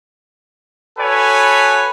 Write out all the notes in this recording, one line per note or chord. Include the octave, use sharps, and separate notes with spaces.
F#4 A4 B4 C#5 G#5 B5